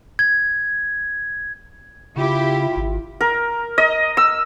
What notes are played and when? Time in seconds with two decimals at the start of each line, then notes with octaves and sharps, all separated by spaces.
0.19 G#6
2.16 C#3 E4 F4 G4
2.77 G#1
3.21 A#4
3.78 D#5
4.17 E6